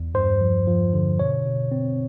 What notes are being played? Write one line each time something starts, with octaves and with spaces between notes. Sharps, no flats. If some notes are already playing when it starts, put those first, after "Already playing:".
Already playing: E2
G2 C5
F3
F3
D3
B2 C#5
B2
C4